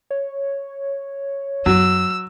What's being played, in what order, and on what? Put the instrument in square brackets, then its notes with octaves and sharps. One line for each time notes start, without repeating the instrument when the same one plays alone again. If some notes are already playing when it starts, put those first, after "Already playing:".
[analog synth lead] C#5
[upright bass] F#2 [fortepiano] F#3 [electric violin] E6